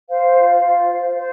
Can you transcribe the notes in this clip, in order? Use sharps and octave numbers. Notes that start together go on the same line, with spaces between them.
C5 F5
F4
F4
C5
C5